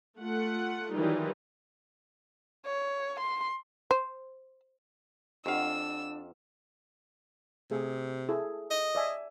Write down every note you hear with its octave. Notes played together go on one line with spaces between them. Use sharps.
A3 F4 F#5
D#3 E3 F#3 G3 D#4 F4
C#5
C6
C5
F2 D4 G4 D#5 F5 F#5 E6
C3 A3 G#4
E4 G#4 A4
D#5
D5 E5 G#5